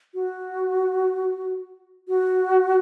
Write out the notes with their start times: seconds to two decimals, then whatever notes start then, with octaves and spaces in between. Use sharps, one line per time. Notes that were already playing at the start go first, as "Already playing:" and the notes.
0.14 F#4
2.08 F#4